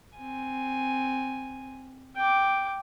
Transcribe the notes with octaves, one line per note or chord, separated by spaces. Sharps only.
C4 G#5
G5 D6